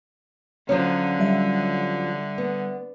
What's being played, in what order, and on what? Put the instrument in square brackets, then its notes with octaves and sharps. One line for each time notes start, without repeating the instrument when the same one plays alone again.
[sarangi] D3 [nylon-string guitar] F3 F#3 C#4
[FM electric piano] G3 E5
[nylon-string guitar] B3